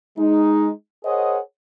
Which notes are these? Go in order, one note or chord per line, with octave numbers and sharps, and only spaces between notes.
G#3 D#4
G#4 A#4 C5 C#5 D#5 F#5